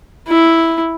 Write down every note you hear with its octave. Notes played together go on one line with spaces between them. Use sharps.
E4